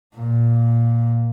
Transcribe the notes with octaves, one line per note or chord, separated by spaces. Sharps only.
A#2